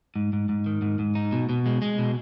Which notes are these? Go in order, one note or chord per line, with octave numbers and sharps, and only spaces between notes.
G#2
G#2
G#2
D#3
G#2
G#2
D#4
B2
B2
G#3
G#3
B2